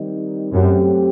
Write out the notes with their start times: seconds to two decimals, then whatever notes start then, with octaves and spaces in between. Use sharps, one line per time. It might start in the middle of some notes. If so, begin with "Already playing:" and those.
Already playing: D#3 G3 C4 D#4
0.53 F#2 A3 C4 G4